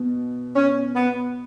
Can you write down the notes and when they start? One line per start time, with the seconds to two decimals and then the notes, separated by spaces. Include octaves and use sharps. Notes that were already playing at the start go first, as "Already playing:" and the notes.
Already playing: B2
0.56 C#4
0.96 B3